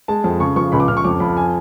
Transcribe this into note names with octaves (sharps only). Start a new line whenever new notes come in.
G#3 A5
F2
C#3 C#6
F3 C#6
C#2 B5
D6
C#2 F6
C#6
F2 D6
F2 B5
G#5